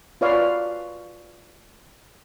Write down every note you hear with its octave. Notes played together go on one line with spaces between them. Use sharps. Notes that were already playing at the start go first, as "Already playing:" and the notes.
F4 B4 C#5 D5 F5